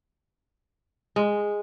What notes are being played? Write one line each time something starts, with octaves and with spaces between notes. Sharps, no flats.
G#3